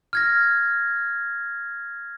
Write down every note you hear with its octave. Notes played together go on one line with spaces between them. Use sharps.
F6 G#6 A#6